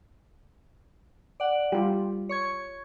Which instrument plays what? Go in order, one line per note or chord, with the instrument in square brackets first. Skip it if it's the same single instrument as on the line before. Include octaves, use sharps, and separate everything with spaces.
[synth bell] D5 F#5
[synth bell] G3 [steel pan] F4 G4
[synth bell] C#5 C#6 G#6